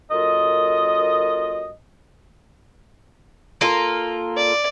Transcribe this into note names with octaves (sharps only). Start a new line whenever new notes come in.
F#2 A#3 F4 A4 D#5
A#3 F4 A4
D5